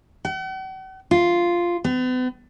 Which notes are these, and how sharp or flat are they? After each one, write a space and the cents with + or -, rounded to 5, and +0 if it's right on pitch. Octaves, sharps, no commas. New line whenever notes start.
F#5 +45
F4 -5
B3 +40